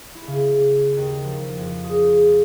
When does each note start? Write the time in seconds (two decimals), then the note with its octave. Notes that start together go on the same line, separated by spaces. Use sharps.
0.15 E4
0.27 C#3
0.97 D#2
1.24 F3
1.57 F2
1.84 G#4